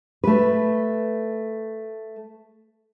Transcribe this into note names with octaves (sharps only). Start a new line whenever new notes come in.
A3 B4